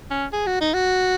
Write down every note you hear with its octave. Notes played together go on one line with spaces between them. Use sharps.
C#4
G#4
F#4
D#4
F#4